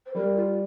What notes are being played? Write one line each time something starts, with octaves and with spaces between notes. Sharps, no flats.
C5
G3 A#4
F4